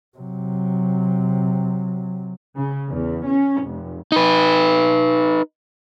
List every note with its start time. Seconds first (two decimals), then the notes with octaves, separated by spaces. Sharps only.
0.17 C3 F#3
2.55 C#3
2.88 E2
3.24 C#4
3.63 F1
4.12 D#4 B4